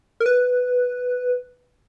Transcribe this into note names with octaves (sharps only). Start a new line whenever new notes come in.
A#4
B4